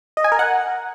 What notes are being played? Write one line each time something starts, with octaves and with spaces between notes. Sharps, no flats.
D#5
G#5
A#4
F#5